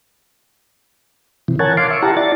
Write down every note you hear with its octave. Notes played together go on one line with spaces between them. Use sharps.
C3 E3
A#4 C#5 F#5 G#5 A5
F5 C6 D6
E5 C#6
E4 G4 F#5 A5 A#5
E4 D5 A6